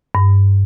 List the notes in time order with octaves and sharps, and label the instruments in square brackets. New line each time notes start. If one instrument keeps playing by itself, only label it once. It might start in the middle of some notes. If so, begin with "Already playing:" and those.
[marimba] G2